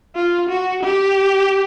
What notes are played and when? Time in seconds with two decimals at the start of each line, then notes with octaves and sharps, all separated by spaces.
0.16 F4
0.49 F#4
0.84 G4